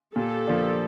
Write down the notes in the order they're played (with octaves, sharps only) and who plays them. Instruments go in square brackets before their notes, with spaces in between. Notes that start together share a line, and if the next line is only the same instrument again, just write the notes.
[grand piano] A#2 [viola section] G4 A4
[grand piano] F3 A#3 D4